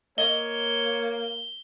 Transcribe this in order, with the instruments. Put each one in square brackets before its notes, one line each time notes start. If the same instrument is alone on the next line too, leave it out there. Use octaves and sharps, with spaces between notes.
[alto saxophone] A#3 [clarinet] C#5 [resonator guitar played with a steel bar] D#5 [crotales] G7